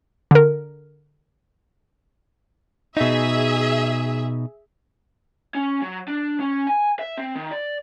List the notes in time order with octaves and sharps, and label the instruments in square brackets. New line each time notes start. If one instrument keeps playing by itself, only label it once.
[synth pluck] D3 A#4
[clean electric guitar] B2 D#4 [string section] G#4 E5
[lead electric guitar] C#4
F#3
D4
C#4
G#5
E5
C4
D#3
D5